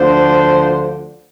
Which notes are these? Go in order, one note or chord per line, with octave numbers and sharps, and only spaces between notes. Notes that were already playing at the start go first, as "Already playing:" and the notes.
Already playing: D2 D3 F3 C5